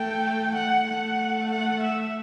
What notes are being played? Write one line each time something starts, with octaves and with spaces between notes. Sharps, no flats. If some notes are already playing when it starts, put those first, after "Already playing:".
Already playing: A3 G5
F#5
A3 F#5
F#5
E5